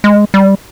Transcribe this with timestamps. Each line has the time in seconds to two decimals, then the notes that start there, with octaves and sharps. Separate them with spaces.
0.04 G#3
0.34 G3